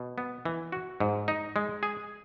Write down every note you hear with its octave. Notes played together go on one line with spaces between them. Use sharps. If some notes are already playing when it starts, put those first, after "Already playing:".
Already playing: B2
B3
E3
F#4
G#2
D#4
G#3
G#4